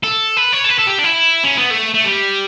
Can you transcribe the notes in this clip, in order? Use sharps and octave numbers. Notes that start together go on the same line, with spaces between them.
A4
B4
C#5
A4
B4
A4
G4
D4
E4
C#4
B3
A3
A3
G3